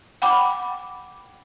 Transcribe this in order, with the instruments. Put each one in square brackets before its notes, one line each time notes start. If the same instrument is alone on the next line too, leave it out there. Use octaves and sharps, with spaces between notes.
[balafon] F#5 G5 B5 D6